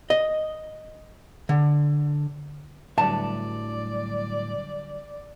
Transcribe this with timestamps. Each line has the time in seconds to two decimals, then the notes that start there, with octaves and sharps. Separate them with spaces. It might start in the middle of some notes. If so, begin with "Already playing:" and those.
0.10 D#5
1.49 D3
2.98 A2 D3 F#3 G3 B4 D5 E5 A5